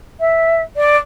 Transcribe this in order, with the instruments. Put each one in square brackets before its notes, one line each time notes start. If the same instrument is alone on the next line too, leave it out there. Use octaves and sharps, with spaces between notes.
[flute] E5
D5